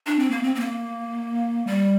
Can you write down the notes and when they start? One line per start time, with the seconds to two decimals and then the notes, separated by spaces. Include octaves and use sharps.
0.07 D4
0.19 C4
0.31 A#3
0.43 C4
0.55 C4
0.60 A#3
1.67 G3